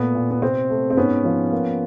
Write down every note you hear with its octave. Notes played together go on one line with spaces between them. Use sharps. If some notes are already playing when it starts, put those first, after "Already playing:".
Already playing: A#2 A3 B3
A#2
B3
C3 C4
A3
C4
G#2 B3 C#4
F3
A#3